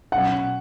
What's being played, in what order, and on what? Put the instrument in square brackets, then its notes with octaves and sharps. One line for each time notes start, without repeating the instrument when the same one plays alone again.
[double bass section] B2 F#3 C#4 [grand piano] F#5